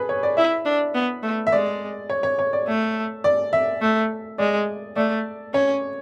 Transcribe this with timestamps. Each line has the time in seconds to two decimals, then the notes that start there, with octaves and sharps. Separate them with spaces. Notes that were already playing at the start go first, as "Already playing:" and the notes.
Already playing: G#4 A4 B4
0.09 C#5
0.23 D5
0.37 E4 E5
0.65 D4
0.95 B3
1.23 A3
1.47 E5
1.52 G#3 D5
2.10 C#5
2.23 C#5
2.39 C#5
2.53 D5
2.67 A3
3.24 D5
3.53 E5
3.81 A3
4.38 G#3 D5
4.96 A3 D5
5.53 C#4 C#5